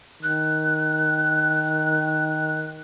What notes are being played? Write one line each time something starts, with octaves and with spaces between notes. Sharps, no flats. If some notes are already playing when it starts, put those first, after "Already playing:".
D#3 F#6